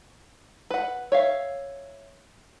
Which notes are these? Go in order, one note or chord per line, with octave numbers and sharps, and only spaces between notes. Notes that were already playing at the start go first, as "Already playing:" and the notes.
B4 F#5
C#5 E5 F5